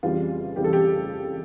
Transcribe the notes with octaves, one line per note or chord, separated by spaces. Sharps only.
F2 C#3 E3 G3 F4
F2 C#3 E3 G3 G4
A4
G4